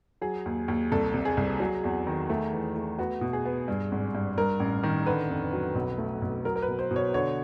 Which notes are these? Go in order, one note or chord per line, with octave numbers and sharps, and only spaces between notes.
F#3 G#4
D#2
D#2
C2 A4
C3
G#4
C2
F#3
E2
D#3
A3
E3
A3
B3 F#4
B2
G#4
B3
G2
G#1
G2
G2 A#4
A1
D#3
D3 B4
F2
F#3
B1
A3
B1
F#3 A#4
A#4
B4
B2
C5
B2
C#5
D3 C#5